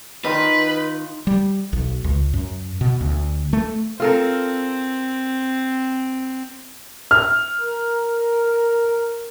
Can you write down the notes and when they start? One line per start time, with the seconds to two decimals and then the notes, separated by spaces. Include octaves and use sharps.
0.25 D#3 F4 B4 C6
1.27 G3
1.73 B1
2.04 C#2
2.33 F#2
2.81 B2
3.01 D2
3.53 A3
4.00 C4 F4 A4 A#4
7.11 F6
7.60 A#4